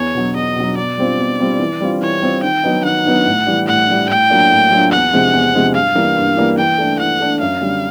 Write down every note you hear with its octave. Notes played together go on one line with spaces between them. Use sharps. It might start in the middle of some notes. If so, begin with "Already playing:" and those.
Already playing: E2 C#5
B2 F#3
E2 D#5
B2 F#3
B2 D5
G3 C4 F4
B2
G3 C4 F4
E3
G3 C4 F4
E3 C#5
G3 C4 F4
D#3 G5
F#3 B3 D#4
D#3 F#5
F#3 B3 D#4
A2
E3 G3
A2 F#5
E3 G3
A2 G5
F#3 A#3 D4 F4
A2
F#3 A#3 D4 F4
E2 F#5
C3 F3 G#3 C4
E2
C3 F3 G#3 C4
G2 F5
E3 G3 A#3
G2
E3 G3 A#3
E3 G5
A3 D4
E3 F#5
A3 D4
F#2 F5
D3 G3